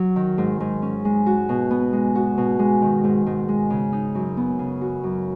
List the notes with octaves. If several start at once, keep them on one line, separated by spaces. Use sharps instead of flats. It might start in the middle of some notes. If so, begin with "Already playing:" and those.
Already playing: F#3
D#3
G#2
G#2
C#4
G#3
F#4
B2
B3
G#3
F#4
B2
G#3
D#3
G#2
G#2
G#3
C#3
D#4
F#2
B3
C#3
F#4
F#2